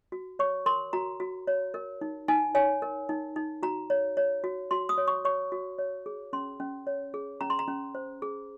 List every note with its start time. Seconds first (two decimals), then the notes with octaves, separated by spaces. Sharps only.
0.12 F#4
0.39 C#5 C#6
0.66 A#4 C6
0.93 F#4 A#5
1.20 F#4
1.47 C#5
1.74 A#4
2.01 D#4
2.28 D#4 G#5
2.55 C#5 G#5
2.82 A#4
3.09 D#4
3.36 D#4
3.63 F#4 A#5
3.90 C#5
4.17 C#5
4.44 F#4
4.71 F#4 C6
4.89 D#6
4.98 C#5
5.08 C#6
5.25 C#5 C#6
5.52 F#4
5.79 C#5
6.06 G#4
6.33 C#4 C6
6.60 C#4
6.87 C#5
7.14 G#4
7.41 C#4 A#5
7.50 C6
7.59 A#5
7.68 C#4
7.95 C5
8.22 G#4